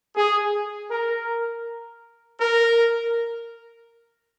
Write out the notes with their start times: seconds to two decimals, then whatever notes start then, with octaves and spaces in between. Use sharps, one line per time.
0.16 G#4
0.90 A#4
2.40 A#4